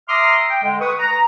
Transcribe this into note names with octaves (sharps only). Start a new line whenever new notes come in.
E5 A#5 C6 D6 D#6 F6
G5
D3 G#3
B4 C#6 D#6
A#5